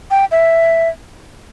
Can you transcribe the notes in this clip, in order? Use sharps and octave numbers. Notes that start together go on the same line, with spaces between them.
G5
E5